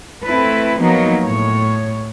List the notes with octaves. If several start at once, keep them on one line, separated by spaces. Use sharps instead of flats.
A3 C4 E4 A4 B4
F3 F#3 A#3 B3 D#4
A2 C#5